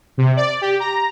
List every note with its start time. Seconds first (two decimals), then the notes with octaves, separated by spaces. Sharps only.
0.18 C3
0.36 D5
0.61 G4
0.80 A#5